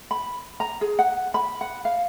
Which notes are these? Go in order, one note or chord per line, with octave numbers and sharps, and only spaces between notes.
B5
A#5
G#4
F#5
B5
F#5
F5